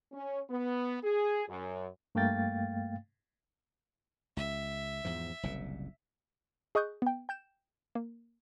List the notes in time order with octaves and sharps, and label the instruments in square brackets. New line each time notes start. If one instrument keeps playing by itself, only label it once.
[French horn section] C#4
B3
G#4
F#2
[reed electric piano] G2 A3 A#3 F5 G5 A6
[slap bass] C#2 [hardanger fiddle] E5
[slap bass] E2 G#2 F3
F#1 C2 A#2
[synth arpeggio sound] G#4 D#5 C#6 D#6 F#6 G6
B3 G5
G5 G6 E7
A#3